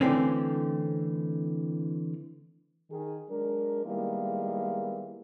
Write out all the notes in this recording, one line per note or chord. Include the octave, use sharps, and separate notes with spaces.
D3 E3 A3 C4 C#4
D#3 G#4
F#3 G#3 D4 A#4
D#3 G3 G#3 A#3 B3 E4